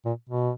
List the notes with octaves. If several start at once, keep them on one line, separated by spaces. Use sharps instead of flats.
A#2
B2